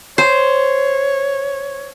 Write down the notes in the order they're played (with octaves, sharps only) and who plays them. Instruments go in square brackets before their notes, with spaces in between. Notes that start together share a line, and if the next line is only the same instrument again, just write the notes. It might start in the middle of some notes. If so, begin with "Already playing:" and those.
[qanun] C5 [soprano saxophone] C#5